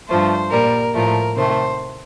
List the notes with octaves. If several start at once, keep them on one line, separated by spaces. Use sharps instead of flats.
G2 F3 A3 C5
A#2 G3 A#4
A2 F3 A3 A#4
C3 D#3 A3 C5